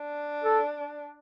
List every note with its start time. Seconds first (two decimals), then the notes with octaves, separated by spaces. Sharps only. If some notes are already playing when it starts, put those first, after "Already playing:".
Already playing: D4
0.44 A4